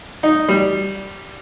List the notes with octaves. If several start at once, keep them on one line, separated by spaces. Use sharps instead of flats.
D#4
G3